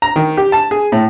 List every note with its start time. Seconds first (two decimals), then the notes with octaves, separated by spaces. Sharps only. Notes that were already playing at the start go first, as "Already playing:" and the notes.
0.02 A#5
0.16 D#3
0.37 G4
0.52 A5
0.71 G#4
0.92 A2